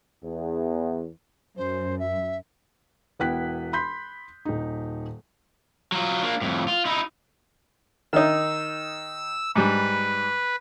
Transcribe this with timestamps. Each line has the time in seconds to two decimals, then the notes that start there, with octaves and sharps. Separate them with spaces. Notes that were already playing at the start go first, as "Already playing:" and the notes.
0.24 E2
1.57 F#2 C5
1.99 E5
3.19 E1 B3 E4 G5 F#6 B6
3.73 B5 C6 G6 B6
4.45 D#1 D#4
5.92 F#3 F4
6.22 A#3 D4
6.41 F2 A2
6.68 F4
6.86 D#4 E4
8.13 D#3 D#4 E6
9.56 G#2 G3 B4